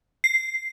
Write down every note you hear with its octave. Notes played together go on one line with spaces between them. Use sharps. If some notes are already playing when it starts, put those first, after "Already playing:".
C7